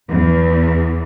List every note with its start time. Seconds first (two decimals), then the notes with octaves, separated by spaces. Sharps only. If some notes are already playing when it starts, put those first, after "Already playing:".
0.10 E2